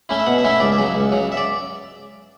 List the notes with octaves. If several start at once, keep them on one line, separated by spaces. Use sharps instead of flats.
A3 C#4 E4
E5
B2 F#5
E5
A3 C#4 E4
E5
C#2 D5
E5
C#3 F#3
C#2
C#3 F#3
E5
D5